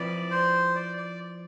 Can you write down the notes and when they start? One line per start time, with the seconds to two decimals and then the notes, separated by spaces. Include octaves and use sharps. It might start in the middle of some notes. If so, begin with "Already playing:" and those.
Already playing: F3 C4 E4 B4 D5
0.31 C5
0.75 D5
0.97 D5